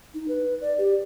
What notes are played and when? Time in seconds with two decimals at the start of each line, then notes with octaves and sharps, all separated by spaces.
0.14 D#4
0.28 B4
0.61 D5
0.78 G4